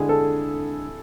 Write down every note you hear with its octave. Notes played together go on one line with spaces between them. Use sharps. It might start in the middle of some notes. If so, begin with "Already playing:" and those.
Already playing: D3 G#3 D4 E4 G#4
A4